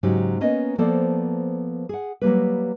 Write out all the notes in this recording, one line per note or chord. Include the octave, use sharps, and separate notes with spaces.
G#2 C#3 F#3 C#4 D#4 G4
A#3 B3 C#4 D#5
F3 A#3 B3 A4 C5 D5
G#4 F#5
F#3 G3 A#3 B4